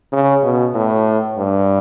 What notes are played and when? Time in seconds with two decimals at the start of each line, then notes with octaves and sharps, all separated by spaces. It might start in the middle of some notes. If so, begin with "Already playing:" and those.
0.12 C#3
0.43 B2
0.75 A2
1.37 G2